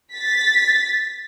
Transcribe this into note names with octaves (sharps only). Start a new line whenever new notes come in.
A6 B6